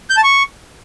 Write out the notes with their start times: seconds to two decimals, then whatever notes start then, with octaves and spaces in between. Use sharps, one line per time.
0.10 G6
0.17 A5
0.24 C#6